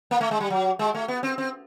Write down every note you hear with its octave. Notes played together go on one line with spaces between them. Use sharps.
A#3
A3
G#3
G3
F#3
G#3
A3
B3
C4
C4